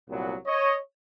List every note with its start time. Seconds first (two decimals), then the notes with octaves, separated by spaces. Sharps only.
0.09 C2 A#2 F#3 B3
0.47 C#5 D#5